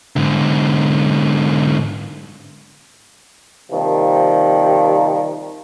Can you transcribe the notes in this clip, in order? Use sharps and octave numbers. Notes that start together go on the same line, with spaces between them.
G#2 D3
D#2 C3 D#3 F3 G3